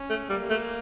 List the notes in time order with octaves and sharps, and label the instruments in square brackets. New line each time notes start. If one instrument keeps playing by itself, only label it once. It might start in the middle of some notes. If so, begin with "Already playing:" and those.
Already playing: [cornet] C#4
[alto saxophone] A3
[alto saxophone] G3 [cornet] A#3
[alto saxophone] A3